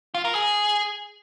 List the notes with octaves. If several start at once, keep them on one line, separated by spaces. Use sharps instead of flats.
F4
A#4
G#4